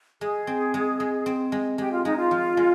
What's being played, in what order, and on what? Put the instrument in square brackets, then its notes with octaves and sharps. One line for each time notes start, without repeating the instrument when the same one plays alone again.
[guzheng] G#3 [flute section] G#4
[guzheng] C4
G#3
G#3
C4
G#3
[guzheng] G#3 [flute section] G4
[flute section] F4
[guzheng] G#3 [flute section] D#4
[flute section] F4
[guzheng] F3
G#3